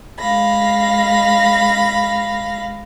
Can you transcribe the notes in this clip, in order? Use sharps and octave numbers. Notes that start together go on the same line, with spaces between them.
G#3 F5 B5 A#6